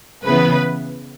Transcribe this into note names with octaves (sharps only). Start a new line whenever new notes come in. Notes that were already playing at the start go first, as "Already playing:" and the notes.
C#3 E3 B3 B4